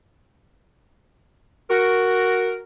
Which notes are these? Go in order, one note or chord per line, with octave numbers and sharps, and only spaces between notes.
F#4 A#4